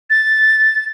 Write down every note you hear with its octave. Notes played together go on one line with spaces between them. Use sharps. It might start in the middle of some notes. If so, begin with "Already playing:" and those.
A6